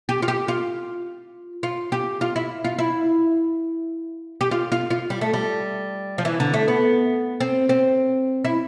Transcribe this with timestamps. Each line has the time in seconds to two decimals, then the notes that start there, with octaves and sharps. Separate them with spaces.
0.09 G4
0.22 F4
0.28 G4
0.48 F4
1.63 F4
1.92 G4
2.21 F4
2.36 E4
2.65 F4
2.79 E4
4.41 G4
4.51 F4
4.72 F4
4.90 F4
5.10 G3
5.21 A3
5.33 G3
6.18 F3
6.25 E3
6.40 D3
6.53 A3
6.68 B3
7.40 C4
7.69 C4
8.45 E4